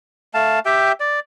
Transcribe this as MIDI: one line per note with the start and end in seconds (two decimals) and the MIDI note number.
0.34 0.59 57
0.34 0.59 77
0.34 0.59 81
0.65 0.92 67
0.65 0.92 76
0.65 0.92 79
1.00 1.20 74